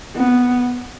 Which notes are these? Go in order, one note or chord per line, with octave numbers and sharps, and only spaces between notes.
B3